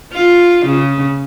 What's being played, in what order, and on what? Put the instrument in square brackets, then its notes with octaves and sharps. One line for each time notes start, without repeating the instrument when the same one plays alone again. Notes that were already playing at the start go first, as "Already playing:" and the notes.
[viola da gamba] F4
C#3